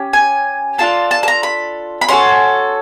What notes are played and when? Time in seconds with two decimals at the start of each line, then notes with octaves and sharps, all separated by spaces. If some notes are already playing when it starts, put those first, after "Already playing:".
Already playing: C#4 G4
0.13 G#5
0.78 D4 F4 A4 A5
1.11 A5
1.23 A5
1.28 A#5
1.43 B5
2.01 B5
2.09 C#4 F#4 A4 C6